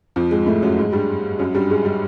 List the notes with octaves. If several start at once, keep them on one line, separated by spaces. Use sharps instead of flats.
F2 F3
G#2 G#3
A2 A3
F#2 F#3
G#2 G#3
G2 G3
F#2 F#3
G2 G3
G#2 G#3
G3